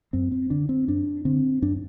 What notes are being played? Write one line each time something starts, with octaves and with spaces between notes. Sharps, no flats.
F#2 C4
C4
D3 D4
C4
F#2 D4
D3 C4
F#2 D4